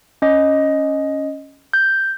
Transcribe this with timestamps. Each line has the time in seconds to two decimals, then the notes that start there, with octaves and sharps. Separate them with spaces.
0.22 C#4 D#5
1.73 G6